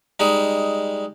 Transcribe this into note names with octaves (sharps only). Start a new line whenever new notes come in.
G3 G#3 D#4